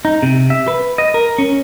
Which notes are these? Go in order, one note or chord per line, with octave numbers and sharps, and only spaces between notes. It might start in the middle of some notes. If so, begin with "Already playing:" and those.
D#4
C3
E5
B4
D#5
A#4
C#4